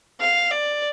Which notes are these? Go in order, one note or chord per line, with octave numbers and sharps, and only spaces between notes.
F5
D5